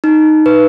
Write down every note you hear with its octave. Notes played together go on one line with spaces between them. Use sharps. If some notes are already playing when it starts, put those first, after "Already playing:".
D#4
B4